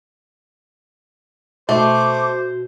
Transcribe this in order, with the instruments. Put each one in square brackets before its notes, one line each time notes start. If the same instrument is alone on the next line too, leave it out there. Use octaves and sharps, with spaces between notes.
[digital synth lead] B2 [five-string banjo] A3 [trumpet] C5 [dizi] D6